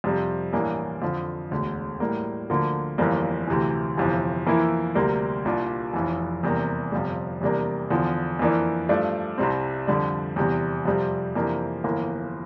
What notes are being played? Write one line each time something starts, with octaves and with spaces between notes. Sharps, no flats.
F2 C3 G3
A1 G2 E3 A#3 D4
F2 D3 F3
E1 D2 D3
A2 G3 A#3
D2 D3 F3 A#3
G1 F2 E3 G3 A#3
D2 C3 E3
G1 F2 C3 E3
F2 E3 A#3 E4
D2 C3 G3 A#3
C2 A#2 G3 D4
F1 F2 E3
E2 C3 G3 A#3
G1 F2 C3 G3
E2 C3 G3 A#3 D4
E2 D3 F3
F2 E3 A#3 D4
G2 F3 A3 D4
C2 C3 G3 C4
F2 D3 G3 D4
E2 C3 G3
F2 C3 G3
F2 C3 E3 A#3 D4
G1 F2 E3 A#3